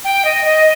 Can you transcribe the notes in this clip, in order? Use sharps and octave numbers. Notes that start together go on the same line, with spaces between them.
G5
D#5
D#5